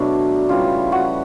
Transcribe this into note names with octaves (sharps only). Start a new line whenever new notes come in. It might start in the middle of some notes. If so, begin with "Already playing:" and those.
Already playing: B2 F#3 A3 D4
C#3 E3 G3 F4
F#4